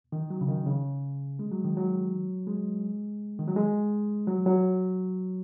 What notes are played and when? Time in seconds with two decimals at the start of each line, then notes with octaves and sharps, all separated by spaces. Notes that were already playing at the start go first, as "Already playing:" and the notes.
0.12 D#3
0.30 F#3
0.41 C#3
0.49 D#3
0.66 C#3
1.39 G#3
1.52 F#3
1.64 D#3
1.77 F#3
2.47 G#3
3.39 D#3
3.48 F#3
3.56 G#3
4.27 F#3
4.46 F#3